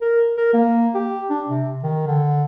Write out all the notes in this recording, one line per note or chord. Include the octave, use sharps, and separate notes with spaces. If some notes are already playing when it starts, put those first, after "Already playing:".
A#4
A#4
A#3
G4
D4
C3
D#3
D3